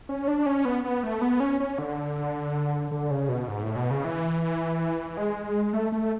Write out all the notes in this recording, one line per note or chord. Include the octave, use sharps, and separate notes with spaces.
C#4
D4
C#4
B3
B3
A3
B3
C#4
C#4
D3
D3
C#3
B2
G#2
A2
B2
C#3
E3
G#3
A3
A3